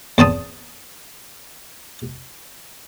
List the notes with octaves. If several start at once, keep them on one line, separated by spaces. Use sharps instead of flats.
E2 C4 A5 D#6